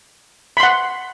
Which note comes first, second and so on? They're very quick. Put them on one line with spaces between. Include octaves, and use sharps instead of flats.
B5 C6 F#5